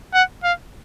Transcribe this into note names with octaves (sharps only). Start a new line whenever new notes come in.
F#5
F5